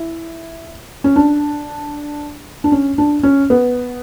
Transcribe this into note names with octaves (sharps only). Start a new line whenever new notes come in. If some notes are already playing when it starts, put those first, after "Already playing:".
Already playing: E4
C#4
D4
D4
C#4
D4
C#4
B3